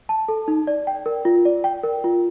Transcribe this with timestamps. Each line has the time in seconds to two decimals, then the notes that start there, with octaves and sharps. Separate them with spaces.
0.09 A5
0.28 A4
0.48 D#4
0.67 D5
0.87 G5
1.06 A#4
1.25 F4
1.45 D5
1.64 G5
1.84 A#4
2.04 F4